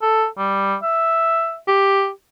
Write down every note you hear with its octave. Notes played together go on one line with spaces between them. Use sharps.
A4
G3
E5
G4